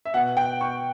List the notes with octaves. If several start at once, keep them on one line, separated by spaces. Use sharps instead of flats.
E5
B2 F#5
G5
C#6